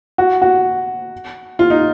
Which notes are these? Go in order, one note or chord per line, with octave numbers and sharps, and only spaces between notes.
F#4
F#4
F4
D#4